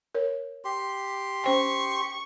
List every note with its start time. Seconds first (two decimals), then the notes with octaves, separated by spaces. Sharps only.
0.15 A#4 C#5
0.65 G4 C6
1.44 C#4 C5 G5 C#6